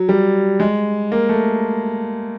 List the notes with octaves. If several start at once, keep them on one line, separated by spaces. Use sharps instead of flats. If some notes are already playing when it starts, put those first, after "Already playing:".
Already playing: F#3
G3
G#3
A#3
A3